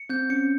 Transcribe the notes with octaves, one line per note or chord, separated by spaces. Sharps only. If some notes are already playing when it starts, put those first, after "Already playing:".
Already playing: C#7
C4 G6
C#4 C#7